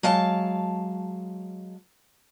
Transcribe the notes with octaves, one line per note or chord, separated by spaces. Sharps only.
F#3 G#3 F5 A5